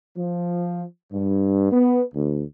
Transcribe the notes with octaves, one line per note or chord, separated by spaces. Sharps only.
F3
G2
B3
D2